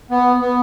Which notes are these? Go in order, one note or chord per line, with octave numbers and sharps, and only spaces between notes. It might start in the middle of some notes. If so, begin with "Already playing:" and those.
B3
B3